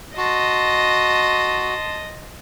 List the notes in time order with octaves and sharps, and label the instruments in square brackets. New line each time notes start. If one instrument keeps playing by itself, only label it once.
[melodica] F#4 [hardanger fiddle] D#5 [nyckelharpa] A5 C6